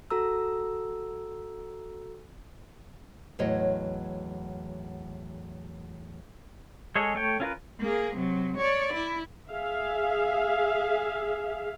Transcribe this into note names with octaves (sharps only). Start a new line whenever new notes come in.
F#4 A4 A#5 E6
E2 A2 F#3 C#5 D#5
G#3 G#4 A4 C#5
A3 C#5 G5
C#4 F4 A#4 B4
A#3 G#4
C3 F#3
C#5 D5
E4
G#4 E5 F5